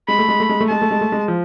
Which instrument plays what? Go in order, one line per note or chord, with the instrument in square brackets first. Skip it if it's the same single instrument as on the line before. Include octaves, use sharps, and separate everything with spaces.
[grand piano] G#3 [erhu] B5
[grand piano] A3
G#3
A3
G#3
A3
[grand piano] G#3 [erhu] A5
[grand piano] A3
G#3
A3
G#3
F3